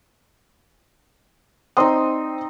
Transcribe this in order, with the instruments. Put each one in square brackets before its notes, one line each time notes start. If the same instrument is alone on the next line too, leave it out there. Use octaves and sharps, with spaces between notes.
[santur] C4 D#4 [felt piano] C5 C6 D#6